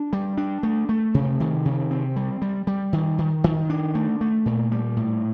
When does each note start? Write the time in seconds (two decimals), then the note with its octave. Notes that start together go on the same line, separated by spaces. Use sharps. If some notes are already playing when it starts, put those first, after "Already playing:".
Already playing: D4
0.13 G3
0.37 D4
0.63 A3
0.89 A3
1.14 C3
1.40 D#3
1.65 C3
1.91 C4
2.16 G3
2.42 G3
2.67 G3
2.93 D#3
3.18 D#3
3.44 D#3
3.70 D4
3.95 A3
4.21 A3
4.46 A#2
4.72 G3
4.96 A2